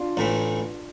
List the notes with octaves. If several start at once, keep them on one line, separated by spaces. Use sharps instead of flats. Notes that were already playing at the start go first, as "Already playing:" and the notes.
Already playing: D4 F4
A1 A2 E3 A3